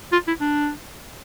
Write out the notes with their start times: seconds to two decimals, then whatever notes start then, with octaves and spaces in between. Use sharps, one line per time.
0.12 F4
0.27 E4
0.40 D4